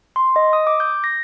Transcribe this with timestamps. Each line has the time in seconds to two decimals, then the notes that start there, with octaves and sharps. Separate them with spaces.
0.16 C6
0.36 D#5
0.53 D#6
0.67 D6
0.80 G6
1.04 A#6